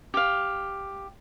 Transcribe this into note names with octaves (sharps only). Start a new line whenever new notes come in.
G4 F5